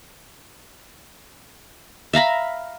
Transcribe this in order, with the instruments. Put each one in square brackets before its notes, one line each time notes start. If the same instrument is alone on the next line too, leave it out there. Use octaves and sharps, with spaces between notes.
[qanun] E5 F5 A#5 B5